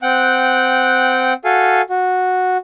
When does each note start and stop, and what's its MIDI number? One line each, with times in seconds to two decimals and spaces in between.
0.02 1.33 60
0.02 1.33 78
0.02 1.33 79
0.02 1.33 90
1.45 1.82 66
1.45 1.82 69
1.45 1.82 77
1.45 1.82 80
1.90 2.58 66